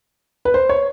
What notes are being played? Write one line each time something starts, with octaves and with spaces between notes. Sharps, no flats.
B4
C5
C#5